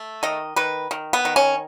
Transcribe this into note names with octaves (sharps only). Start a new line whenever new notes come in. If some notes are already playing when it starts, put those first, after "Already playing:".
Already playing: A3
D#3 D#5
D#3 B4
D#3
B3
D#3
C#4